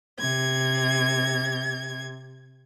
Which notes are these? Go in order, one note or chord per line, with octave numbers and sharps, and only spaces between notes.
C3 G#6